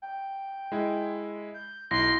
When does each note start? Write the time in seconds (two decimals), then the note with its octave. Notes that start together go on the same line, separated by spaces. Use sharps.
0.02 G5
0.72 G#3 E4
1.54 G6
1.91 B1 E4 C6 A#6